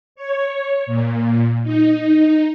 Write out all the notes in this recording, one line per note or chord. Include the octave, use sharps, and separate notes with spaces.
C#5
A#2
D#4